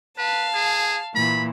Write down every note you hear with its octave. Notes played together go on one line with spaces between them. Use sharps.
B4 F5 A5
G#4
A#2 E3 B5